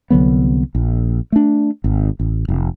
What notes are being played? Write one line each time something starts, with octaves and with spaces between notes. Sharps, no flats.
C2 D3 F#3 B3
A#1
A3 D4
G#1
A1
F1